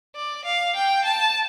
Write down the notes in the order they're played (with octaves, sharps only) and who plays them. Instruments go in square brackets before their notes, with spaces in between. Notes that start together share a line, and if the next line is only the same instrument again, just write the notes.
[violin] D5
F5
G5
A5